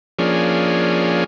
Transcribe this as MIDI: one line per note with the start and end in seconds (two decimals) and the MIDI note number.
0.19 1.24 53
0.19 1.24 58
0.19 1.24 61
0.19 1.24 62
0.19 1.24 68